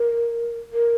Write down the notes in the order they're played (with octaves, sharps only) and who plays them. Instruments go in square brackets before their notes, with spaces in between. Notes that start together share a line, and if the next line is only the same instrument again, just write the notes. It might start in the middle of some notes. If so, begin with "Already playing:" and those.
Already playing: [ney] A#4
A#4